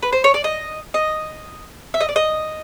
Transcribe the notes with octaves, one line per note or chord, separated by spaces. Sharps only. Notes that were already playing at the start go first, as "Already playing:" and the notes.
B4
C5
C#5
D5
D#5
D#5
E5
D#5
D5
D#5